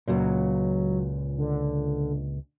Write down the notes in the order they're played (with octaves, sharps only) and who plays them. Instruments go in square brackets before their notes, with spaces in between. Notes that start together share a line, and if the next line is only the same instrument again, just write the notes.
[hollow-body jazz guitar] C#2 A#2 [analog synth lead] F#3
[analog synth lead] D3